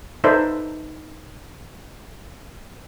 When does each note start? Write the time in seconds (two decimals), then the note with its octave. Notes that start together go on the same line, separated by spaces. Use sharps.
0.24 D#4 A4 B4 C5 D5 E5